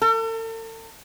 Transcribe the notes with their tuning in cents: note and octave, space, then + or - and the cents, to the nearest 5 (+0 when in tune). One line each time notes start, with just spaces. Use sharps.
A4 +40